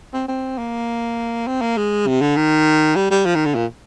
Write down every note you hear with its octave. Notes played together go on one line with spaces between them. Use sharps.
C4
C4
A#3
C4
A#3
G#3
C3
D3
D#3
G3
G3
F3
D#3
D3
A#2